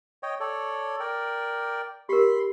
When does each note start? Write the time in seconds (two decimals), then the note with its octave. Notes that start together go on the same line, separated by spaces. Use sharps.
0.23 C#5 D#5 G5
0.40 A4 C#5 D5
1.00 A#4 D5 G5
2.09 G4 A#4 B5 C6